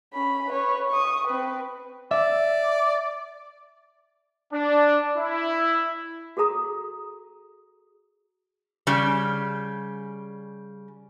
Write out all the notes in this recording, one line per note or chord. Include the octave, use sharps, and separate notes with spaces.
C#4 B5
B4 C#5
C#6 D#6
C4 B4
D5 E5
D4
E4
F#4 G#4 A4 A#5 D#6
C#3 G3